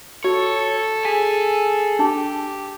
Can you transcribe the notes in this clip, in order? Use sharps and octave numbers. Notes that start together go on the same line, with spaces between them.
F#4 A4 C#5
G#4 G#5 B6
D4 G4 A5